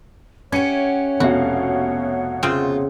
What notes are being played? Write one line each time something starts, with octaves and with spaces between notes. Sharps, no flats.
C#4 G4 C#5 E5 F#5 G#6 C#7 D#7
F1 B2 F#4 F5
C#3 C4 F4